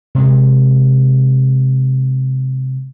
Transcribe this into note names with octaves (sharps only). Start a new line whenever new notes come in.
C3 G#3